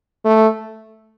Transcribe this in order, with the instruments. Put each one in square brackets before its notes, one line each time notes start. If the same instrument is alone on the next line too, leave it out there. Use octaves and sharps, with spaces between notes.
[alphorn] A3